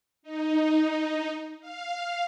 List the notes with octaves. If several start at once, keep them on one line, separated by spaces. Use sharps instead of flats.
D#4
F5